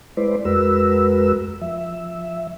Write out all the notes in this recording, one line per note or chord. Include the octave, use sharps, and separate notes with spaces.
G#3 E4 B4 C5 D5
F2 G#3 F#4 A#4 B4 E6
F3 E5